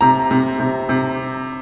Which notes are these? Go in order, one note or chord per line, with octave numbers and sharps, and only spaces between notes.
C3 A#5
C3
C3
C3